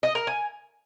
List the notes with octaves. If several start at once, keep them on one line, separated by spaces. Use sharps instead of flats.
D#5
A#4
G#5